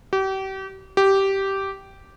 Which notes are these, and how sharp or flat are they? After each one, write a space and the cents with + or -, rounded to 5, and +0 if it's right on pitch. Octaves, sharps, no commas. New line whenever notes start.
G4 -35
G4 -10